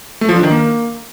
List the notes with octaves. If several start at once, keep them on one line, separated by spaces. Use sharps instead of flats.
A3
F3
D4
D#3
A#3